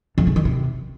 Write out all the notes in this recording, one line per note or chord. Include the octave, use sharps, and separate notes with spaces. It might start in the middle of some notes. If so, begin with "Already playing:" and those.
F2
C#3
D#3
C3